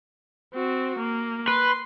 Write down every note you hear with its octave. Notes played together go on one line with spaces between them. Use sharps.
C4 F#4
A#3
B4 C6